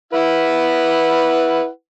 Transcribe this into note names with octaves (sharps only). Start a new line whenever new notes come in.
E4 B4 F#5